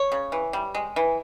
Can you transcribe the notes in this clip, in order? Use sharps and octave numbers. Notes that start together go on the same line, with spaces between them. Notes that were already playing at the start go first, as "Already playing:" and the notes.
Already playing: C#5
C#3
E3
G3
G#3
E3